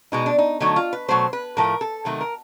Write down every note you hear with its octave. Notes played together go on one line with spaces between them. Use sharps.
B2 G#3 D#4
D4
D#4
D3 F#3 A3 D#4
F4
B4
B2 F#3 A3 C5
B4
A2 F3 A3 A#4
A4
C3 D#3 F#3 A3
A#4